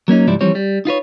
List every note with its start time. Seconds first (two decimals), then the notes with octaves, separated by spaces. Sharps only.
0.08 F#3 A#3 C#4 D#4
0.27 C#2 G#2 F3 G3 E4 D5
0.41 E3 F3 G3 C4 C#5
0.55 G3
0.85 D#4 F4 B4 C#5